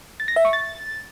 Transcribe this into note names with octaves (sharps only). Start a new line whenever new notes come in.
A6
A#6
E5
C#6
A6